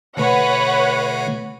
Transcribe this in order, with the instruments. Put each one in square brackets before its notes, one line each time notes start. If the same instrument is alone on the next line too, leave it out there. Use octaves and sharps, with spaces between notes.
[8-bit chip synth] B2 D3 A3 [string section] B4 C#5 F#5